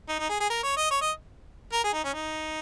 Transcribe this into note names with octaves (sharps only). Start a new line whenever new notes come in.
D#4
D#4
G#4
G#4
A#4
C#5
D#5
C#5
D#5
A#4
G#4
D#4
C#4
D#4